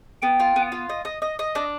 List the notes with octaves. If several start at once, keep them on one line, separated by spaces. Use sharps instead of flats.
B3 G5
F4
B3
F4
D#5
D#5
D#5
D#5
D4